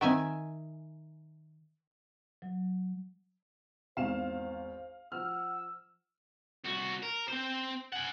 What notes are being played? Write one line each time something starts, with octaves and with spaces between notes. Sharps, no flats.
D#3 C4 E5 F#5 G#5
F#3
G#1 E2 C5 F5 E7
F3 F#5 E6 F6
C2 F#4
A#4
C4 C5
G#4 F#5